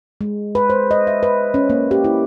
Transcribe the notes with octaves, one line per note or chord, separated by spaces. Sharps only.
G#3
B4
C5
D#5
E5
B4
C#4
A#3
G4
E4